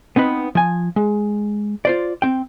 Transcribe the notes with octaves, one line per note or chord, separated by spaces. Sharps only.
B3 C4 D#4 B4
F3 G#5
G#3
F4 C5 D5
C4 G5